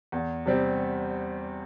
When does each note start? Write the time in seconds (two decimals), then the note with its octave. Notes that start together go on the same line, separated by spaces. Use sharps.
0.12 E2
0.46 C3 G3 C4